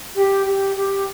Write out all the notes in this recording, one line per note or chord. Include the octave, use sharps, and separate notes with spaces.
G4
G4
G4